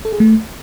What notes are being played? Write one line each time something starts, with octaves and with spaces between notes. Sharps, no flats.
A4
G#4
A3